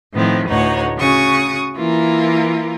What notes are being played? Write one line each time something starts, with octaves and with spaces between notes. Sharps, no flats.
A2 D#3 F3 B3 C4
D2 A2 D#4 B4 C#5 F#5
C#3 F#4 C#6 D#6
E3 A#3 E4 F4 A#4